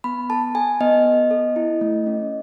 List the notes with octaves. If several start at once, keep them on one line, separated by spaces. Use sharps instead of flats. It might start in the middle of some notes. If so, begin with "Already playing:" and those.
B3 B5
A4 A5
A4 G#5
B3 D#5
B3
A4
E4
A3
C#4